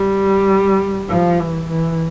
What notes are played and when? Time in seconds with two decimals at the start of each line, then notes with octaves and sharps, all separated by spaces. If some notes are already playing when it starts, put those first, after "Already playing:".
Already playing: G3
1.09 F3
1.40 E3
1.70 E3